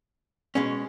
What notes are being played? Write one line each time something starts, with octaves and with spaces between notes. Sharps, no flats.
B2 G#3 C#4